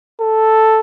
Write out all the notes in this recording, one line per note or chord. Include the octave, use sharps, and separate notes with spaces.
A4